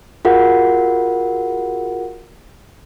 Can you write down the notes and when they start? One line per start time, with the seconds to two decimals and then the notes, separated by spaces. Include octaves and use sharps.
0.25 F4 F#4 G#4 A#4 F5 F#5